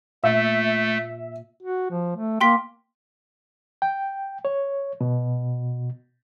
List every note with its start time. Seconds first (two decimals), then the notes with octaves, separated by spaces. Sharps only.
0.24 A#2 A3 E5
1.63 F#4
1.90 F3
2.16 A3
2.41 A#3 G5 C6 B6
3.82 G5
4.45 C#5
5.01 B2